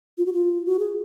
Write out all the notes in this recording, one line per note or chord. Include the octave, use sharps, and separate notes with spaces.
F4
F#4
F4
F#4
G#4